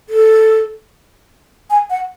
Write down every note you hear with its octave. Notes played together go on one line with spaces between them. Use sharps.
A4
G#5
F#5